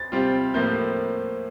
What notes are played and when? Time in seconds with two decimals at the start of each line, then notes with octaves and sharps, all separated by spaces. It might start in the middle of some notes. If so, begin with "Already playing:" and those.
Already playing: A6
0.12 C3 G3 C4 F4
0.54 A2 F3 A#3 E4 G6